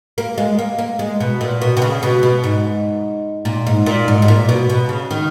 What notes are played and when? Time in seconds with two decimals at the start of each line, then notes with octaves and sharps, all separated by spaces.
0.18 A#3
0.38 G#3
0.59 A#3
0.78 A#3
0.99 G#3
1.20 B2
1.41 A#2
1.62 B2
1.77 B2
1.82 C#3
2.03 B2
2.23 B2
2.44 G#2
3.45 A#2
3.67 G#2
3.86 A#2
4.08 G#2
4.22 G#2
4.28 A#2
4.49 B2
4.70 B2
4.89 C#3
5.11 D#3